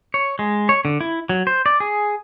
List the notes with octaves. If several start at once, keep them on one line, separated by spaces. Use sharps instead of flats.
C#5
G#3
C#5
D3
E4
F#3
C5
D5
G#4